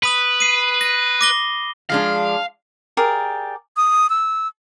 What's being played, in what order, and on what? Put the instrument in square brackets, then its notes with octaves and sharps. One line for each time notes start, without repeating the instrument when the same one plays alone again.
[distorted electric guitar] B4 [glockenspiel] B5 D#6 F#7
[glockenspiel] C7 D#7
A#6
D6 A#6 G7
[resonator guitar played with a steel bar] F3 G#3 D4 [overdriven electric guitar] F5
[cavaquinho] G4 G#4 A#4 D5
[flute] D#6
E6